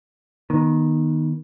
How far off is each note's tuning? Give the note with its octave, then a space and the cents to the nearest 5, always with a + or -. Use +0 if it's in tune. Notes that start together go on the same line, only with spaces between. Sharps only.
D#3 +0 B3 -25